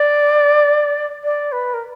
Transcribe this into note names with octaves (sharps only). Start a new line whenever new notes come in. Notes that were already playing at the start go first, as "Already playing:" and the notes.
Already playing: D5
D5
B4
A#4